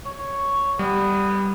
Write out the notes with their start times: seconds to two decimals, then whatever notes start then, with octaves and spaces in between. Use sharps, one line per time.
0.06 C#5
0.79 G3 B3